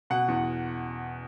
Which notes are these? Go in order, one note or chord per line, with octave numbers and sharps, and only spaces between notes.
B2 F#5
E2